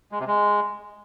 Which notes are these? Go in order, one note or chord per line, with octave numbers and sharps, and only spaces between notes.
G#3
C3
G#3